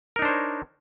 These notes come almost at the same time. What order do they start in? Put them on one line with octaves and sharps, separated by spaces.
A#4 D#4 D4 C5 C#5